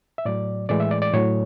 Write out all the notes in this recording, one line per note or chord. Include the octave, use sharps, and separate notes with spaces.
E5
A2 F#3 D5
A2 E3 G#3 D5
E5
D5
D5
A2 F#3 C#5